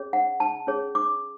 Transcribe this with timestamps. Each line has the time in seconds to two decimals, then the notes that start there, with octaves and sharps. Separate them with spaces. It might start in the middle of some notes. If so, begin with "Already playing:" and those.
Already playing: C#4 G#4 C#5
0.13 F#5
0.40 A5
0.67 C#4 G#4 C#5
0.95 D6